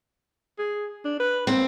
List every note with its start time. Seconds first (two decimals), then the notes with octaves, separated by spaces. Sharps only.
0.58 G#4
1.05 D4
1.20 B4
1.47 A#3 C4